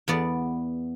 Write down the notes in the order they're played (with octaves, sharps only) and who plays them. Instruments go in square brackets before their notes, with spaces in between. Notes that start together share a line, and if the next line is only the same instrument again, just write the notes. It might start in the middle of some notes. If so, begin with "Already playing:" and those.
[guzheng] E2 B3 D5